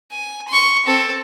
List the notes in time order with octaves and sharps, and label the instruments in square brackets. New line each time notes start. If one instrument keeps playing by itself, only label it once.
[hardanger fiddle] G#5
C6 C#6
C4 A4